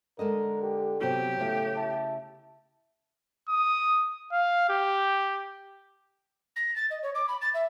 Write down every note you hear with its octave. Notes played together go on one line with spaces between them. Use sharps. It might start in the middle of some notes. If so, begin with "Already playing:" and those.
D3 G#3 A4 A#4 D#5
G4
C3 F#3 B3 G4
A2 C#3 A3 F5
E4 A5
D#6
F5
G4
A#6
A6
D#5
C#5
D6
B5
A6
E5